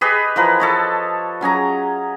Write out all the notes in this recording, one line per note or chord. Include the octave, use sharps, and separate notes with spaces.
G4 G#4 B4 D#5
E3 F3 A#4 B4
A4 C#5 D#5
F#3 C#4 G#4 A#5